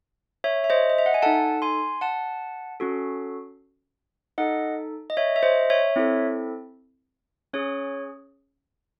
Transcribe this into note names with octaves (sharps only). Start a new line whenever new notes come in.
C#5 E5
E5
C5 D#5
D#5
E5
F#5
G#5
D#4 A4 F#5 A5
G#5 C6
F#5 A5
C#4 F#4 A4
D#4 A4 D#5 F#5
D#5
C#5 E5
E5
C5 D#5
C#5 E5
C4 E4 A4
C#4 G#4 C#5